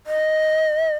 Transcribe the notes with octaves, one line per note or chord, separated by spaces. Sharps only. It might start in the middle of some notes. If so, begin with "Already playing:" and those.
D#5